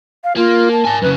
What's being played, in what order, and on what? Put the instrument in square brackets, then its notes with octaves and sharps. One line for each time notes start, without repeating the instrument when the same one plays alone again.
[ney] F5
[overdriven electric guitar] A#3 [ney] F4
[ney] A5
[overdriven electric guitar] A#4 G#5
[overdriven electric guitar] F#2 C#3 [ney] B4